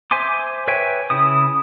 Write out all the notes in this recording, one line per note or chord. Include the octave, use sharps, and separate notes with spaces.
C5 E5 G#5 C6 D6
B4 C#5 E5 G5 G#5
C#3 E4 D#6